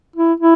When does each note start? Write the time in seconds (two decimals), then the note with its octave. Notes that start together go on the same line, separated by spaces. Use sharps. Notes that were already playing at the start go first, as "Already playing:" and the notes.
0.16 E4
0.40 E4